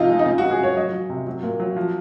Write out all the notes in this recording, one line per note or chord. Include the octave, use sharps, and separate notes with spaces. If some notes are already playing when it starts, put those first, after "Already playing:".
Already playing: C3 F3 D#4 F4
G#3
D#4
C#3 F4
F#4
G#3
G#4
C#3 C#5
F#3 D#5
F#3
C3
F#3
A#2
F#3
F3